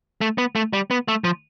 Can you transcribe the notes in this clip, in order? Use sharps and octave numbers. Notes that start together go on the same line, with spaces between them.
A3
B3
A3
G3
B3
A3
F3